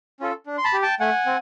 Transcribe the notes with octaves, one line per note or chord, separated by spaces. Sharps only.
C#4 F4 A4
D4
C6
A5 B5
G4
G5 A5
A3 F#5 G#5
C4